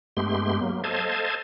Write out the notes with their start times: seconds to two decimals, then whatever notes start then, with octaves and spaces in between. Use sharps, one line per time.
0.17 G2 G#3 A3 B3 G4 C6
0.60 F#3 A#3
0.84 A4 C5 D#5 F5 A5 G#6